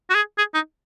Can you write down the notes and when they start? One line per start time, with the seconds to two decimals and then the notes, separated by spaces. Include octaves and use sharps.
0.10 F#4
0.15 G#4
0.38 G#4
0.54 D#4